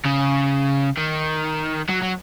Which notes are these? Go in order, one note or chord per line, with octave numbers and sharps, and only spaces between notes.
C#3
D#3
F#3
F#3